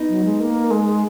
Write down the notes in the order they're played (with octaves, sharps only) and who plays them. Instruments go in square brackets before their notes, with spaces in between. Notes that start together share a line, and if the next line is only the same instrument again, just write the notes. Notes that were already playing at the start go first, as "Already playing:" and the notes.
Already playing: [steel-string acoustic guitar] B3 D#4
[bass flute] F#3
G#3
A#3
G#3